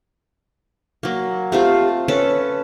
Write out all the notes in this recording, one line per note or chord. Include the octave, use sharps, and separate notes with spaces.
F#3 A#3
A3 C4 F4 G4
C#4 A4 B4 C#5